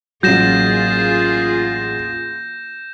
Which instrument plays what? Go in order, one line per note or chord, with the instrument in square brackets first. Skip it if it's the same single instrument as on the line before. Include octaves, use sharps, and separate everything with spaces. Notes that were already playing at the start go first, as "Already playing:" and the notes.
[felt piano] A1 F#3 [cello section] A#3 F4 G#4 [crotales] G6 A#6 E7